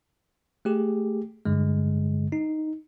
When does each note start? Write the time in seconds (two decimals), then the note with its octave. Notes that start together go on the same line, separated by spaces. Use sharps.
0.65 A3 G4 G#4
1.45 G2 D3 G#3
2.32 D#4